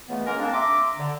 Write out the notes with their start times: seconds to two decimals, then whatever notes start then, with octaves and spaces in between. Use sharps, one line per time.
0.09 C#2 E3 A3 B3
0.25 G#3 A#3 C#4 A#4
0.40 A#3 C4 D4
0.53 E5 A#5 C6 D6
0.98 D3